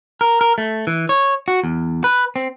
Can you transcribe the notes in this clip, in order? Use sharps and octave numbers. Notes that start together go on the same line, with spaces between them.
A#4
A#4
A3
E3
C#5
F#4
E2
B4
C4